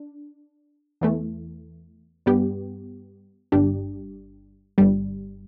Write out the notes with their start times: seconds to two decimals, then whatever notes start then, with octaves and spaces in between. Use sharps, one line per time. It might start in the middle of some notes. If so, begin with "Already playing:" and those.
Already playing: D4
1.01 E2 E3 A3
2.26 G2 G3 B3 G4
3.52 G1 G2 G3 D4 G4
4.78 G1 G2 G3